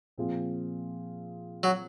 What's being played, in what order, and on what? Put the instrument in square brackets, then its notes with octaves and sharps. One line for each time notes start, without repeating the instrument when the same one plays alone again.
[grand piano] A#2 F3 C4 F4 G#4
[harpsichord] F#3